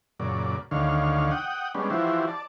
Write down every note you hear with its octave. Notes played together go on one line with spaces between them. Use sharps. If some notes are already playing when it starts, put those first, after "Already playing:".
F#2 A#2 C#3 D5
D2 D3 D#3 C#5 F5
F#5 G5 D#6
G3 G#3 B3 C#4 D4
E3 F3 E4 F#4 G4 C5
D5 A5